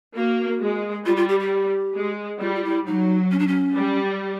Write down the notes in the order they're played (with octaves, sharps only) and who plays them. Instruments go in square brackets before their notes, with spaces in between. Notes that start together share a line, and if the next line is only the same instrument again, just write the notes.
[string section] A#3 [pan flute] F#4
[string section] G#3
[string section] G3 [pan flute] F4
[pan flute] F4
G4
G4
[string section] G#3
[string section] G3 [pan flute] F4
[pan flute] F4
E4
[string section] F#3 [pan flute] D#4
[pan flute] C#4
D4
C#4
[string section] G3